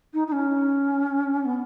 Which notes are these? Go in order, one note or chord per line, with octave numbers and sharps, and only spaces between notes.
D#4
D#4
C#4
B3